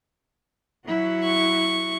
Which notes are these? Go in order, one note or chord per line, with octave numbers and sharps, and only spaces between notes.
F#3 E4 F#4
C#6